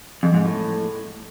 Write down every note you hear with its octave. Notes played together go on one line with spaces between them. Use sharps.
F2
G#2
A2